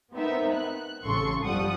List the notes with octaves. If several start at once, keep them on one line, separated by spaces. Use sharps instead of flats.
B3 C4 D#4 A#4 E5
F#6
A1 C#3 A4 C6 C#6
G1 F3 G3 F#5 D#6